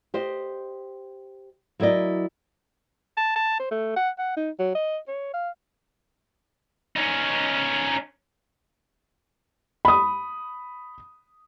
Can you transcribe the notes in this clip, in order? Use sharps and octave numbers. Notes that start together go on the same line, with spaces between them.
G4 C5 D#5
F#3 E4 A#4 D5 D#5
A5
A5
C5
A3
F#5
F#5
D#4
F#3
D#5
C#5
F5
C#4 D#4
B5 D#6